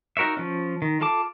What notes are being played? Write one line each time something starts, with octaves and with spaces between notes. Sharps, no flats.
D#4 F#4 A#4 C#5 E5
F3 C#4
D#3
F4 A4 A5 D6